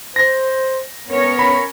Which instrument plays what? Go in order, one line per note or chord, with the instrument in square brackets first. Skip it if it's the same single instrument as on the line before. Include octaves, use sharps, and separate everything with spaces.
[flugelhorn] C5 [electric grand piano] A#6
[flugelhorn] B3 [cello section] C#4 A#4 C#5
[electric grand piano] B5